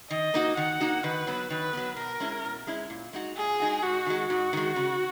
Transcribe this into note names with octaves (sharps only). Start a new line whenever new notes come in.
D#3 D#5
A#3 D#4 F#4
D#3 F#5
A#3 D#4 F#4
D#3 B4
F#3 B3
D#3 B4
F#3 B3
B2 A#4
G#3 C#4 E4
B2
G#3 C#4 E4
A#2
G#3 D#4 F#4
A#2 G#4
G#3 D#4 F#4
G#2 F#4
D#3 G#3
G#2 F#4
D#3 G#3
C#3